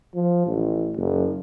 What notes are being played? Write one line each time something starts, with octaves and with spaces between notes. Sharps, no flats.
F3
A1
F#1